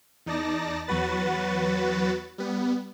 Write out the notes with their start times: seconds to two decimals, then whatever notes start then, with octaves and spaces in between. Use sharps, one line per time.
0.26 E2 D#4 D5 A5 A#6
0.87 E2 F#3 F#4 B4 A6
2.38 G3 B3